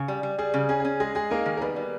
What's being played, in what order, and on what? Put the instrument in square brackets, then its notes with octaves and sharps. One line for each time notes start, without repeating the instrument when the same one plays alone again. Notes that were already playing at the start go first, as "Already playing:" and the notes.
Already playing: [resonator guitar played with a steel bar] C#3
G3
G3
[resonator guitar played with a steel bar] G3 [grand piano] G#4
[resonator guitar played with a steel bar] C#3
[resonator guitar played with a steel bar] C#4 [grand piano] G#4
[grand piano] G#4
[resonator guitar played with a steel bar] C#4
[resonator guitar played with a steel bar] G#3 [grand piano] G#4
[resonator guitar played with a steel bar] G#3 [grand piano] G#4
[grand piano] A#3 A#4 [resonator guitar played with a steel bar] D#4
[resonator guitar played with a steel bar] D#3
[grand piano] A#4
[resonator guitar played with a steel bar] G3 [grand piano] B3 B4
[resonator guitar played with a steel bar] G3